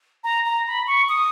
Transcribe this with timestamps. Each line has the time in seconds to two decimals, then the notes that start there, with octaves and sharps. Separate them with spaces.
0.24 A#5
0.45 A#5
0.67 B5
0.87 C#6
1.09 D#6